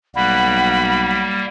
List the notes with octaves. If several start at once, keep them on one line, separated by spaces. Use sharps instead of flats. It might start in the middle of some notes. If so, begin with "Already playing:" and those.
B1 G3 A#3 F#5 B5